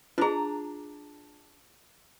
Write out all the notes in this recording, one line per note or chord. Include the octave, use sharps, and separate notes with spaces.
D4 F4 G#4 A#5